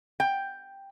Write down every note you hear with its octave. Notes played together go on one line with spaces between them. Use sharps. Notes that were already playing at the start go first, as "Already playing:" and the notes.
G5